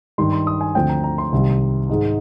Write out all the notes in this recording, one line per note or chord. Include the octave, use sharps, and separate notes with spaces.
G2 D#3 G3 C6
C6
D#6
G#5
D2 D3 F3 C4 G5
A#5
A#5
C6
C2 C3 D#3 G3
G#2 D#3 G#3 D#4